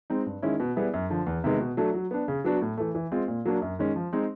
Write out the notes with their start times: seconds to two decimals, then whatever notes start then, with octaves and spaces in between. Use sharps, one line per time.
0.10 G#3 C4 D#4
0.26 G2
0.42 D#3 G#3 C#4 E4
0.60 B2
0.76 G3 B3 E4 G#4
0.94 F#2
1.10 D3 F3
1.26 E2
1.44 C3 D#3 G#3 B3
1.60 B2
1.77 F#3 A3 D4
1.94 F#3
2.11 B3 D4
2.28 C#3
2.44 F#3 B3 D4 F#4
2.62 A2
2.77 E3 A3
2.95 E3
3.12 G#3 C4 F4
3.28 A#2
3.45 F#3 A#3 D4
3.62 F#2
3.79 D#3 G#3 C#4
3.96 F3
4.13 G#3 C4 D#4